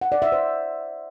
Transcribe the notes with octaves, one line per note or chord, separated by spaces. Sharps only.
F#5
D5
E5
C5